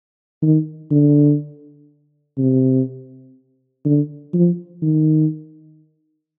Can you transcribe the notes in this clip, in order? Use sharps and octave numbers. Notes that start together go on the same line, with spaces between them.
D#3
D3
C3
D3
F3
D#3